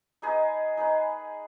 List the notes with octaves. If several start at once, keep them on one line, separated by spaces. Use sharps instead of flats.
D#4 G#4 B4 D#5
D#4 G#4 B4